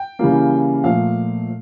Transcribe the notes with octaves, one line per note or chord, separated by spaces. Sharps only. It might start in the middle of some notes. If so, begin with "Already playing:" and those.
Already playing: G5
C#3 E3 G3 A#3
A#2 F3 A3 F5